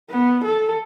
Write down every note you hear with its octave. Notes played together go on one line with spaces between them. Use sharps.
B3
A4